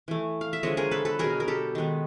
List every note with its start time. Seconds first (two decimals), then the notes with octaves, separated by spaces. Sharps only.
0.08 E3 A3
0.41 F5
0.53 E5
0.63 D3 F3 G#3 C#5 D#5
0.77 G#4 A#4
0.91 A4 B4
1.05 A4 B4
1.19 B2 F#3 B3 G#4 A#4
1.40 A#4
1.48 G4 A4
1.75 D#3 G#3 B3